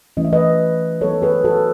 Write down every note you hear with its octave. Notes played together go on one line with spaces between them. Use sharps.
E3 A3 C#4 D#5
E5
B4 D#5
F#3 B3 D#4 A4 C#5
G#4 B4
F#4 A4